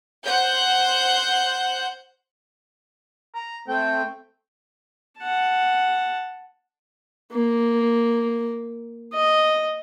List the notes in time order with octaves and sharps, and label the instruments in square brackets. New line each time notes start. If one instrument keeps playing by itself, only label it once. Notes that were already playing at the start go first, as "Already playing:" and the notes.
[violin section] C5 F#5 G6
[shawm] A#5
[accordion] A3 C4 [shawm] G5
[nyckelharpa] F#5 A5
A#3
D#5